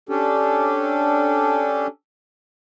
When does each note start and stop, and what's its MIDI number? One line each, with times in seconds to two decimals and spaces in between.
0.09 1.87 61
0.09 1.87 62
0.09 1.87 67
0.09 1.87 69